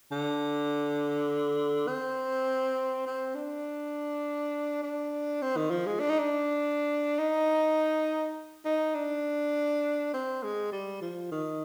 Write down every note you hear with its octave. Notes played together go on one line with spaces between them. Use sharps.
D3
C4
C4
D4
D4
C4
D#3
F3
G#3
D4
D#4
D4
D#4
D#4
D4
C4
G#3
G3
F3
D#3